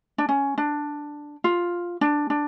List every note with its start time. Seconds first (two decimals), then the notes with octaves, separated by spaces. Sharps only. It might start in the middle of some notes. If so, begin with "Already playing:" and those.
0.18 D4
0.29 C#4
0.58 D4
1.44 F4
2.01 D4
2.30 D4